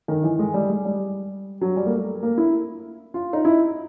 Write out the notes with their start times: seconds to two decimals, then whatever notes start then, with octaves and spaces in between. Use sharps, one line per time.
0.08 D#3
0.24 E3
0.39 G#3
0.54 G3
0.69 G#3
0.85 G3
1.61 F#3
1.77 G3
1.86 A#3
1.92 A3
2.23 A#3
2.38 E4
3.14 F4
3.33 D#4
3.45 E4